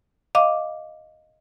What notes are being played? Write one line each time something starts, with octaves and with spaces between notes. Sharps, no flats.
D#5 F5 D6